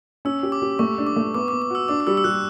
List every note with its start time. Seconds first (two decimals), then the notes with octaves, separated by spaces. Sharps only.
0.25 C#4 E6
0.43 G4
0.52 D6
0.62 G4
0.79 A3 C#6
0.98 D4
1.07 D6
1.16 A3
1.35 B3 D6
1.48 D6
1.53 B3
1.62 D6
1.70 F#4 E6
1.88 D4 D6
2.00 D6
2.07 G3 E6
2.17 E6
2.24 G3 F#6